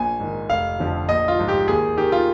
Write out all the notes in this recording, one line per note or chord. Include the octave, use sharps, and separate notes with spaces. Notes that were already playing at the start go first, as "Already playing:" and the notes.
Already playing: A#1 G#5
G#2 D#3
F1 F5
F2 D3 F3
A#1 D#5
F4
G#2 F3
G4
D#2 G#4
D#3 G4
F4